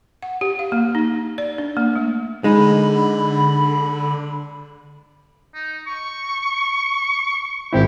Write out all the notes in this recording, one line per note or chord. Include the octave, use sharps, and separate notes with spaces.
F#5
G4
F5
A#3
D#4
D5
D4
A#3
A3
D3 G#3 D#4 B5
D#4
C#6
G#1 C4 E4 G4